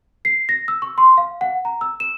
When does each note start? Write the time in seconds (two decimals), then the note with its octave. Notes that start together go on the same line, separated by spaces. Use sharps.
0.25 C7
0.49 A#6
0.68 E6
0.82 C#6
0.98 C6
1.18 F5
1.41 F#5
1.65 A#5
1.81 E6
2.00 E7